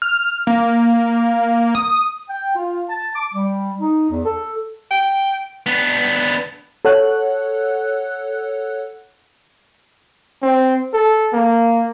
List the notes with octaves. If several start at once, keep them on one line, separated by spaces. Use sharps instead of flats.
F6
A#3
D#6
G5
F4
A5
D6
G3
D#4
E2
A4
G5
B3 D4
A4 C#5 F#5 F#6
C4
A4
A#3